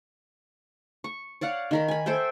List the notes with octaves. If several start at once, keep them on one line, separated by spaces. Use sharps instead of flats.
C#6
C#5 D5 F5 F#5
D#3 A#4 B5
G#5 B5
A4 C5 E5 G5